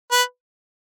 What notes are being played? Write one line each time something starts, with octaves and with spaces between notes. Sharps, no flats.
B4